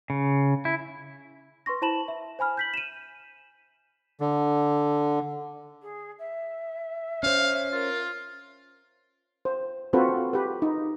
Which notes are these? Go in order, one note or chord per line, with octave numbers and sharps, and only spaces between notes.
C#3
E4
B4 C6 C#6 A#6
E4 C5 A5 B5 E7 F#7
E5
C5 G#5 B5 F6
G6 B6 F#7
D#7 E7
D3
G#4
E5
C#4 C5 F5
F4 A#4
C5
C4 F4 F#4 A4 B4 C5
G4 B4
D#4